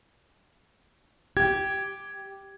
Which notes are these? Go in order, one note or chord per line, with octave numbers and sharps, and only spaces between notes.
G4 G#6